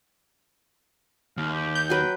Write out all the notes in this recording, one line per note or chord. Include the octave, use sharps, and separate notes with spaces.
D#2 F5
G4
G6
F#3 B4 G5